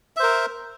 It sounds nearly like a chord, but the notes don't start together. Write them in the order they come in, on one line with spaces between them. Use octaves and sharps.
E5 C5 A#4